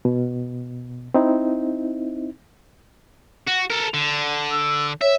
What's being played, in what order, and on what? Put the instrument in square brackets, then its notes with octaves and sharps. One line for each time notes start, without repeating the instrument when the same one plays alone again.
[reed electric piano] B2
C4 D#4 E4
[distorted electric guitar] F#4
A4 A#4
D3
[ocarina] E6
[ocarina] C#5 [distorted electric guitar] E5